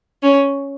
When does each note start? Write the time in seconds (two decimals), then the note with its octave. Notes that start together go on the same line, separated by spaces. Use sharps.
0.23 C#4